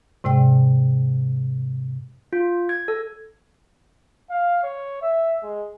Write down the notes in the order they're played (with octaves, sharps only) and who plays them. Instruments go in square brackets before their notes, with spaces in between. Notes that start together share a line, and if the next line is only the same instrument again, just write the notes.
[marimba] G#2 C3 G#3 D5 G5
[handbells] F4
G#6
A4
[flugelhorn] F5
C#5
E5
G#3